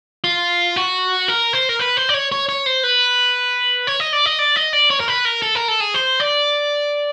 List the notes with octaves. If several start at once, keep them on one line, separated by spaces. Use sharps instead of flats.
F4
F#4
A#4
C5
A#4
B4
C5
D5
C#5
C#5
C#5
C5
B4
C#5
D#5
D5
D#5
D5
D#5
D5
C#5
A#4
B4
A#4
A4
A#4
A4
G#4
C5
D5